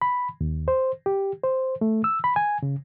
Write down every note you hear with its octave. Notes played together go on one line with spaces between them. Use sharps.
B5
D#2
C5
G4
C5
A3
E6
B5
G#5
C#3